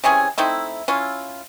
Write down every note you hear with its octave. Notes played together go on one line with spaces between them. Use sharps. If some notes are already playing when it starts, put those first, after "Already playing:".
C3 E3 C#4 G#4
A3 C4 D#4 E4
C#4 E4 F4